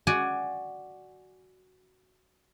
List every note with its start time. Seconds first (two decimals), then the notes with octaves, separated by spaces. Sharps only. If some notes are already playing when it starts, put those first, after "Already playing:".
0.07 F#4 D5 G#5